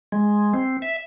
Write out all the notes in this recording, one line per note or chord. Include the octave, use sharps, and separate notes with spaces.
G#3
C4
E5